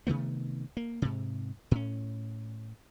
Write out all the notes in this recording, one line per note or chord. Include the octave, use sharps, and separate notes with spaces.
C3 D#3 A3 B3
A#3
G#2 C3
A2 C#4